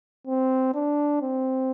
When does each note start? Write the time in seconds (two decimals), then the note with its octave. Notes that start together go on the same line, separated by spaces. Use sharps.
0.27 C4
0.75 D4
1.22 C4